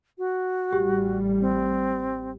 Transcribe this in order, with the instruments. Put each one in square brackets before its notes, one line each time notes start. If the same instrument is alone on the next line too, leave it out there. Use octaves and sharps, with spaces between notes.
[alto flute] F#4
[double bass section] A1 G3 [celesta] G4
[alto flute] C4